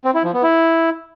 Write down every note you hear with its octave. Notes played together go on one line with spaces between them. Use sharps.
C4
E4
F3
B3
E4